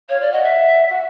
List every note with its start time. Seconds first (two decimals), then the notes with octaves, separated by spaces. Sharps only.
0.09 C#5 F5
0.21 D5
0.32 D#5 F#5
0.44 E5
0.89 F#5